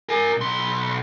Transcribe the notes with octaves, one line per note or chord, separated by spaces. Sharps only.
A#4 G#5
B1 C6